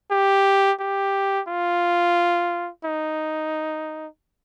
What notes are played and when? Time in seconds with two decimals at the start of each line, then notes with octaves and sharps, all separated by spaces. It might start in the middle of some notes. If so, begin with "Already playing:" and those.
0.11 G4
0.80 G4
1.48 F4
2.85 D#4